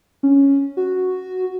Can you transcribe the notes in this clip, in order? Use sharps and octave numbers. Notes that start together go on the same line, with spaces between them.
C#4
F#4